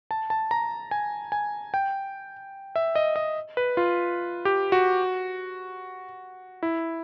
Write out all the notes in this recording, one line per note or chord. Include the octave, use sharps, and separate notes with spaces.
A5
A5
A#5
G#5
G#5
G5
E5
D#5
D#5
B4
F4
G4
F#4
E4